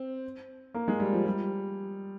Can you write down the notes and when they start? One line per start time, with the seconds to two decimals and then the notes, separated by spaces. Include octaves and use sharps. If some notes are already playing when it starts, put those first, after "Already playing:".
Already playing: C4
0.74 A#3
0.88 G#3
1.00 G3
1.13 F3
1.26 G3